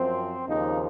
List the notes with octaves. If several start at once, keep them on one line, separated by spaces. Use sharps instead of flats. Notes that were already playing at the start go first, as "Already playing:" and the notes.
Already playing: F#2 F3 C4
D#2 C#3 F3 D#4